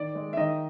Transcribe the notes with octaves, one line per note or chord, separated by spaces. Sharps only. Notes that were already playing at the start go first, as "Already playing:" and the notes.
Already playing: D#3 D5
G#3
E5
D#3 D#5